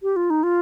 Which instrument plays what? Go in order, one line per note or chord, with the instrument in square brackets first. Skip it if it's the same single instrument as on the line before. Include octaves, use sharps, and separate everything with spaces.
[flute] G4
F4
D#4
F4